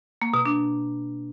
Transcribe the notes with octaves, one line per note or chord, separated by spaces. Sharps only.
A#3
B2
D4